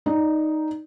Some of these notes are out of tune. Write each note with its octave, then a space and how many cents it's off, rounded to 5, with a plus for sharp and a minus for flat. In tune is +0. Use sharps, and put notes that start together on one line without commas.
D#4 +0 D5 +0